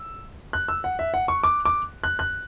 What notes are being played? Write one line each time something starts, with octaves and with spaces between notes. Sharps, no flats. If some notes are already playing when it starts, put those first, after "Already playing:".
Already playing: E6
F#6
E6
F#5
E5
F#5
C#6
D6
D6
F#6
F#6